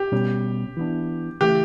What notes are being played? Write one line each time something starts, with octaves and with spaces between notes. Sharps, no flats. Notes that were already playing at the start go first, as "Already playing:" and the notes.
Already playing: G4
B2 G3 C#4
E3 B3 D4
C#3 E3 A3 G4